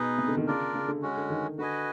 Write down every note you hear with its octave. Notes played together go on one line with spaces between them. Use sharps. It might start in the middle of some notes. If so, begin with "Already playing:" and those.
Already playing: B2 D#4 G#4 B4 D#5
C3
D3
D#3
C#3 D4 F4 A#4 D5
C#3
D3
G#3 C#4 F#4
D3
D#3
D3 F#4 B4 D#5 G#5